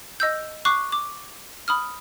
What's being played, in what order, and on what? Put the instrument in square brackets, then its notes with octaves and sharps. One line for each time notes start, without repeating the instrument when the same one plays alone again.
[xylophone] D#5 E6 G6
C#6 D6 F#6 C7
D6
B5 D#6 F6